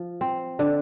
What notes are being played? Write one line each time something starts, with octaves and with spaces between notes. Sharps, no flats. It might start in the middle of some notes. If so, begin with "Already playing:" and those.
Already playing: F3
C4
D3